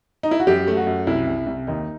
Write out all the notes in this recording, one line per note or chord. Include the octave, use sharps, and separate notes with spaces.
D#4
E4
F#4
F#2 G4
A3
F#4
F#2
C2 E4
C2
C2
D#2 D#4